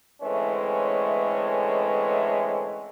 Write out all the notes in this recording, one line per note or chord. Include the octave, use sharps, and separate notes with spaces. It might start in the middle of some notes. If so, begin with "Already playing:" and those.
D3 E3 G#3 A3 C4 C#4